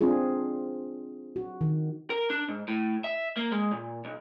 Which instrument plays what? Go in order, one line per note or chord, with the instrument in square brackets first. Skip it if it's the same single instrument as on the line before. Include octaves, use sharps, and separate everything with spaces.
[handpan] C4 D4 F4 G#4
F#4
D#3
[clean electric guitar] A#4
D4
G#2
A2
E5
A#3
G#3
A#2
B1